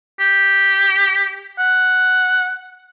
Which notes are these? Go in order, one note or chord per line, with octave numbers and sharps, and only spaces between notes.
G4
F#5